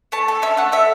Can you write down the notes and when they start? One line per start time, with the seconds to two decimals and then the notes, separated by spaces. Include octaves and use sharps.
0.12 A3 A5
0.28 A4 A5
0.42 C#4 E5
0.57 A3 F#5
0.72 A3 E5